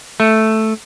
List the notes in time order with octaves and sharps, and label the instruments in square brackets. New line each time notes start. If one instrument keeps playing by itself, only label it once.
[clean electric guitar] A3